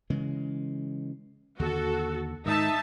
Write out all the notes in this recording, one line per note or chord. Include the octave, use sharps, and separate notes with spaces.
C#3 E3 G#3
D#2 D3 F#4 A4
G#2 D#3 D#4 E5 A5